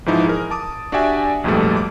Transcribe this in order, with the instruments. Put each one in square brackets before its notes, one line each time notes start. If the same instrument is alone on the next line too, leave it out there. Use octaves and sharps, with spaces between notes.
[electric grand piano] G#2 E3 F3 D#4 E4
G#4 A#4
A5 D6 D#6
D4 F#4 G4 D5 E5 G#5
A#1 F2 G#2 B2 G3 A3
D6